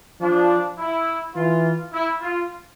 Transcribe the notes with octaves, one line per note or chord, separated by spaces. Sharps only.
F3 D4
E4
E3 F4
E4
F4